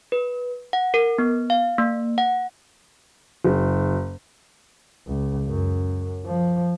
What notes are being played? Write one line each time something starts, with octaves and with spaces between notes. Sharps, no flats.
B4
F#5
A#4
B3
F5
A#3
F#5
F#1
C#2
F#2
F3